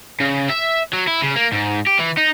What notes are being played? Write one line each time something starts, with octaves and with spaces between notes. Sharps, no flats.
C#3
E5
F#3
E4
C#3
A#3
G#2
G4
E3
D#4